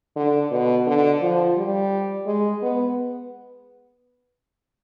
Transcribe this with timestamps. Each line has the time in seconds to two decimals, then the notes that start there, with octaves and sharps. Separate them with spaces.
0.16 D3
0.51 B2
0.87 D3
1.22 F3
1.57 G3
2.26 G#3
2.62 B3